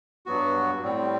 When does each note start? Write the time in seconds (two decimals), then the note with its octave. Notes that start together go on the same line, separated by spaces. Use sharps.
0.26 G2 F#3 B3 F#4
0.83 A2 G3 C4